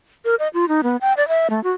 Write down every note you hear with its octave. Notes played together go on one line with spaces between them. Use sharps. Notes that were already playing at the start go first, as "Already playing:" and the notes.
A#4
D#5
F4
D#4
B3
G5
D5
E5
A3
F#4